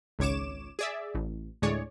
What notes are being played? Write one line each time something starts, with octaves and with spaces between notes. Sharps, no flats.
G#1 C#2 C#5 D6 E7
G#4 D5 E5
A1
D2 A2 G#3 G#4 C#5 D5